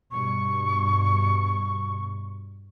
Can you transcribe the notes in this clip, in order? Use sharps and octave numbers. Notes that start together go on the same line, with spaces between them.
G2 B2 C#6